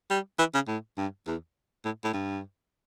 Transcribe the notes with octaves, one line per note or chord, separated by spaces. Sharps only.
G3
E3
C#3
A2
G2
E2
A2
A2
G2